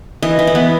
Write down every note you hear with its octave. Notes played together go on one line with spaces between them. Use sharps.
E3 D#5
E3
E4
B3